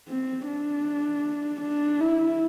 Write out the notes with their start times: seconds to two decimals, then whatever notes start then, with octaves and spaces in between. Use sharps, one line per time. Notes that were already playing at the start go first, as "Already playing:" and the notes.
0.08 C4
0.47 D4
1.61 D4
2.00 E4